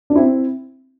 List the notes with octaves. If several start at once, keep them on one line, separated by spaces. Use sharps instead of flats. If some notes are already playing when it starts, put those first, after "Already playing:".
D4
C4 E4